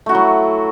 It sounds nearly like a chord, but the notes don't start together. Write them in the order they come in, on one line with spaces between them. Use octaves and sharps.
A3 F#4 E4 F#3